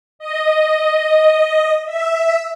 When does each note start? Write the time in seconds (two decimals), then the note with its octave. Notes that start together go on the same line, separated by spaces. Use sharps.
0.19 D#5
1.86 E5